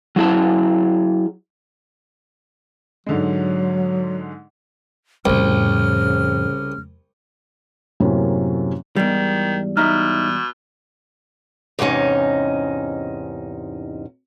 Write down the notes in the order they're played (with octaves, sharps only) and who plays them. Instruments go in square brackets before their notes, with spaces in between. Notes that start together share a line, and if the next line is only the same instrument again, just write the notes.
[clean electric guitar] F#3 E4 G#4 A5
[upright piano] G#2 D3 G#3 [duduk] F#3
[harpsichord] C2 [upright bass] F2 A2 [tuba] C#3 [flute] F6
[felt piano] F#2 A2 C3 F#3 A#3 C#4
[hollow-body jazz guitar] E2 G#2 G3 [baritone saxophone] D#3
[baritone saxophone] B2 [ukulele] D#4 E5 [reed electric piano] F6
[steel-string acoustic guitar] E2 G#2 C3 C#4 D#4